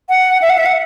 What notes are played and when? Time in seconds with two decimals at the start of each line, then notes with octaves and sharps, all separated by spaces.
0.09 F#5
0.42 E5
0.50 F#5
0.58 E5
0.66 F#5